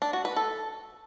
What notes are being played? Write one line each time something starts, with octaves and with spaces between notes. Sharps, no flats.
D4
F#4
B4
A4